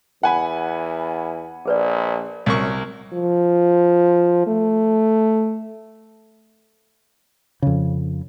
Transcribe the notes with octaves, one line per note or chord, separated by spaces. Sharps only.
E2 F#5 G#5 B5
A#1 G#4 B4 D5
C2 F#2 A#4 C#6
F3
A3
F2 C#3